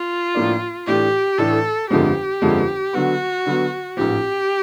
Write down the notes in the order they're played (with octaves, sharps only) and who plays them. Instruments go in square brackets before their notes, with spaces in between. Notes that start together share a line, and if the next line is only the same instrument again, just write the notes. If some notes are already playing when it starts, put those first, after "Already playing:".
Already playing: [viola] F4
[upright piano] A2 F3 A#3 D4
[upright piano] A2 E3 A3 D4 [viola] G4
[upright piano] A2 E3 A3 D4 [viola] A4
[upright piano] G1 F2 D3 F3 G#3 [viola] G4
[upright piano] G1 F2 D3 F3 G#3
[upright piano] D3 F#3 B3 [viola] F#4
[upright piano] D3 F#3 B3
[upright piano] A1 G#2 F3 [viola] G4